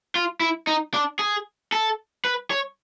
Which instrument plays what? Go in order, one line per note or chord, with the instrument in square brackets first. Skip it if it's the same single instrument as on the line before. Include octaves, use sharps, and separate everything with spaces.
[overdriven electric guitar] F4
E4
D#4
D4
G#4
A4
B4
C#5